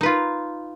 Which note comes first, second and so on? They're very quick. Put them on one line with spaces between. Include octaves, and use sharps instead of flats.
D#4 B4 F4